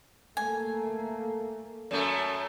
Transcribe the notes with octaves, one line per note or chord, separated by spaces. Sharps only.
A3 A#3 G#5
F#2 A3